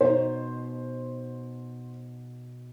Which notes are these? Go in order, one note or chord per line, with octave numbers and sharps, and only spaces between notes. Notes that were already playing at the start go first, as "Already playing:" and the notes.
B2 D#4 C5